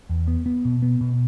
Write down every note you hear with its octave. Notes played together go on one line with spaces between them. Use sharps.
E2
B3
B3
B2
B3
B2